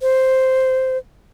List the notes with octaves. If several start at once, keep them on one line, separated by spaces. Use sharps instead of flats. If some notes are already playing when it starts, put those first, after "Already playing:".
C5